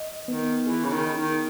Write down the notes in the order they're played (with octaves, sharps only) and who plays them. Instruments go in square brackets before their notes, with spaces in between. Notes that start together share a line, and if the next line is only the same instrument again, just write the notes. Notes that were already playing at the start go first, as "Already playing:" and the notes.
Already playing: [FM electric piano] D#5
[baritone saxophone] D#3 [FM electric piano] B3
[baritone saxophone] E3 [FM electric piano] G#4
[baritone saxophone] C#3
D#3
[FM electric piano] D#4
[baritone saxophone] D#3